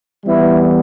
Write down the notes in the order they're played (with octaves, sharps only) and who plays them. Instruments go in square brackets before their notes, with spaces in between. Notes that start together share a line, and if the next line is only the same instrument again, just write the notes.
[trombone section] E3 G3 B3 E4